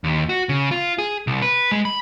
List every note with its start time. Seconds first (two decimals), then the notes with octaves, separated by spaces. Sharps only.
0.04 D#2
0.29 F#4
0.49 C#3
0.71 F4
0.98 G#4
1.27 C2
1.42 B4
1.71 G#3
1.85 B5